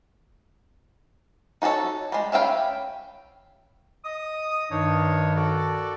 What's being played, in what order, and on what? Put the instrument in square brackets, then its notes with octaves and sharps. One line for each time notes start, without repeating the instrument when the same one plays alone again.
[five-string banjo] D#4 F#4 G#4 A4 C#5
G3 G#3
C#4 E5 F5 G5 B5
[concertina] D#5 [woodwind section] D#6
[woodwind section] G2 D#3 [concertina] D4 D#4 C#5
[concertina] F#4 A4 D5